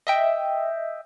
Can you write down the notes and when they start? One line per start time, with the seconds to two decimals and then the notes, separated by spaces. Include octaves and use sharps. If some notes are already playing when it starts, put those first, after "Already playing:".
0.07 D#5 E5 G5